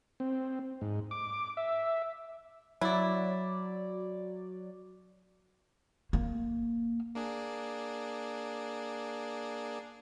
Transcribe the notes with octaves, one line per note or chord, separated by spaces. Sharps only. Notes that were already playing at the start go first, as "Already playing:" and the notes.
C4
G#2
D6
E5
F#3 E4 D5
A#3
A#3 D4 G#4